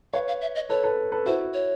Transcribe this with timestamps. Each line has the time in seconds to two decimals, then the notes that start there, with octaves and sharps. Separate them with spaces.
0.13 B4 C#5 F5
0.28 F5
0.41 E5
0.55 D#5
0.69 A4 B4 C#5
0.84 A4 B4
1.12 A4 B4
1.26 E4 F#4 C5
1.54 C#5